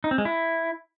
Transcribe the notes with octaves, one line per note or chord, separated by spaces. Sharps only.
D#4
C4
G#3
E4